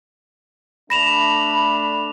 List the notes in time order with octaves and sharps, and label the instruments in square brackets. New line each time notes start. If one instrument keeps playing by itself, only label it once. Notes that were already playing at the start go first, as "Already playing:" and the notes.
[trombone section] A3 D4 [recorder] B5 [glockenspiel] A#6 E7 F7